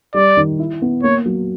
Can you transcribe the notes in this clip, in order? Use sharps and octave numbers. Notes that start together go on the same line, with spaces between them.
G3 D5
D#3
E4
B3
A#3 C#5
F#3